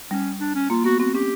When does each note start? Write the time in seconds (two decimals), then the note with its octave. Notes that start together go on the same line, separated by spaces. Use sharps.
0.10 G3 C#4
0.40 D4
0.55 C#4
0.70 A#3 F4
0.84 B3 F#4
0.99 C4 F#4
1.14 C#4 G4